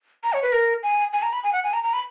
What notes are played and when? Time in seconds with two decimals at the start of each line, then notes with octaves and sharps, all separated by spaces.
0.24 A#5
0.33 C#5
0.43 B4
0.52 A#4
0.83 G#5
1.13 G#5
1.23 A#5
1.33 B5
1.44 G#5
1.53 F#5
1.64 G#5
1.73 A#5
1.83 A#5
1.93 B5